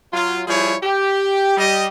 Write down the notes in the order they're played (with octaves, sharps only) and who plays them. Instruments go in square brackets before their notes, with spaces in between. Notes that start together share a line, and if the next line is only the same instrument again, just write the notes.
[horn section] F#3 F4
F3 G3 E4 F4 G#4 C#5
G4
G3 G4 D#5